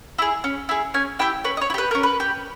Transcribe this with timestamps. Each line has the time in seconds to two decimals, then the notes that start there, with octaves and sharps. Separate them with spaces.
0.18 E4 G#4
0.44 C#4
0.69 E4 G#4
0.94 C#4 G#5
1.19 E4 G4 G5
1.44 C#4 B4
1.57 D#5
1.61 C#5
1.70 E4
1.74 G4 B4
1.91 C#4 A#4
2.03 B4
2.20 G4